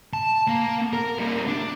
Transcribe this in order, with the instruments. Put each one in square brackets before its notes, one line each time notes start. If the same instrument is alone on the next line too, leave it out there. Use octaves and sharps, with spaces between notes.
[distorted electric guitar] A5
A#3
A#4
G3 A#3
D4